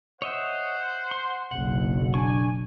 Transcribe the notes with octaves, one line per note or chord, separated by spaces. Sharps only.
C5 C#5 D#5 E5 F#5
C6
F#1 B1 F#5
D4 G#5 C#6